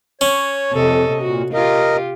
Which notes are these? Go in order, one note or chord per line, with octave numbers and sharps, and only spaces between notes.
C#4 C#5
F2 C3 A4 D#5
A#2 F#4
F4 G4 A#4 D#5